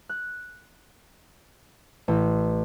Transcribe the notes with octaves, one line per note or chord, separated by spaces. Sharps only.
F#6
A1